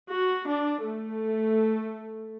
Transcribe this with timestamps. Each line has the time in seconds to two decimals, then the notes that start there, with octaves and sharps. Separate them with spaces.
0.10 F#4
0.47 D4
0.83 A3